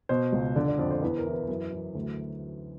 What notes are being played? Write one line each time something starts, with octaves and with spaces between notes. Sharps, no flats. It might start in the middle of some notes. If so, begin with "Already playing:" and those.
B2 C5
C#2
D3 D5
D5
F2 D5
C5
E2 B4
A#4
E3
B4
F#2
E3
D2